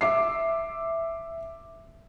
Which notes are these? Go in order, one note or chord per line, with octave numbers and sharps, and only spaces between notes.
E5 D6 C7